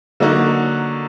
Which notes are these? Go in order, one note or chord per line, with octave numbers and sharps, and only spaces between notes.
D3 F#3 A#3 D#4 F#4